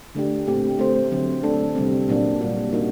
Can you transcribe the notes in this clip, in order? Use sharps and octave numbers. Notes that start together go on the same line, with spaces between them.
D3 A3 D4 G4
A#2 A3 C4 G4
A3 C4 G4 C5
D3 F#3 C4
A3 D4 A4
C3 G3 C4
A#2 F#3 A#3 D4
A#2 G3 A#3 D4 F#4
G3 A#3 D#4 F#4